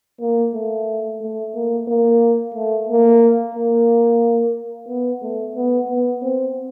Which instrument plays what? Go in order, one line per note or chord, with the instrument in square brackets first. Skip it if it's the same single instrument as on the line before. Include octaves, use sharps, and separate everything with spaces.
[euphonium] A#3
A3
A3
A#3
A#3
A3
A#3
A#3
B3
A3
B3
B3
C4